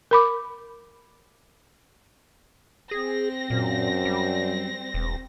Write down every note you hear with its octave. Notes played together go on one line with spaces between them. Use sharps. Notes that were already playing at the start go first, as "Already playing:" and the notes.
A#4 B5 D6
C4 G#4 A#6
F#2 A#2
G3
E1